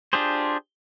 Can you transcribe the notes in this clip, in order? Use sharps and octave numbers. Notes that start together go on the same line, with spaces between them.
D4 F4 G4 G#4 C5